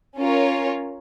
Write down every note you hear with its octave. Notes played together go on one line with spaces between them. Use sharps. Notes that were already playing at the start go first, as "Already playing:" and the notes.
C#4 F4 A#4 C#5